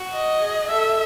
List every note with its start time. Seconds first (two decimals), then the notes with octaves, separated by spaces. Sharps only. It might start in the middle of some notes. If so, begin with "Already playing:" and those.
Already playing: F#4
0.13 D#5
0.40 G#4
0.70 A4 E5